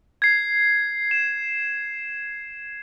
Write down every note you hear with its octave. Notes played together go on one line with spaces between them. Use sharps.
G#6 C7
E7